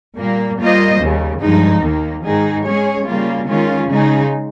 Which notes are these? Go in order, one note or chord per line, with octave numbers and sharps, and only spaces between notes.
A#2 G3 A#3
G3 A#3 F4 C5 D#5
D#2 C#3 G3
G2 F3 G#3 D#4
D#2 D#3 A#3
G#2 D#3 G#3 D#4 G#4
G#3 C#4 G#4 C#5
C#3 G3 A#3 F4
D#3 G#3 C#4 F4
C#3 G#3 D#4 G#4